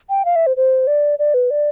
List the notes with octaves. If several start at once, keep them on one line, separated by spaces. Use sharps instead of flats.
G5
F5
E5
C5
C5
D5
D5
B4
D5